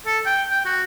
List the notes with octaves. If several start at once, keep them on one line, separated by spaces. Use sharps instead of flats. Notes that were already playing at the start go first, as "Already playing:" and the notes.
A4
G5
G5
F#4